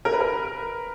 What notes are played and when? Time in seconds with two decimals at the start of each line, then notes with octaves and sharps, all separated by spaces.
0.05 A#4
0.13 B4
0.20 A#4